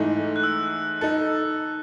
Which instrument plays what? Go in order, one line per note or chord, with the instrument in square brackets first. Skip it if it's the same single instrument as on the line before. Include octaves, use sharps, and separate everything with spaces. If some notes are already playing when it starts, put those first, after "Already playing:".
Already playing: [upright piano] G#2 E3 A3 D#4
[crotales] F#6
E6
[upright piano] D#4 A4